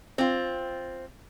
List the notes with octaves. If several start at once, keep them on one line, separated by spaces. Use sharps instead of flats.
C4 F4